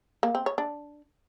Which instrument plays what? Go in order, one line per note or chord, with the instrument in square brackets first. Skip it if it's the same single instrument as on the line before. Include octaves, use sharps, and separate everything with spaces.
[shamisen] A#3
C4
C#5
D4